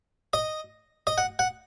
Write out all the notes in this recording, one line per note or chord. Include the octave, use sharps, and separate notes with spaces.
D#5
D#5
F#5
F#5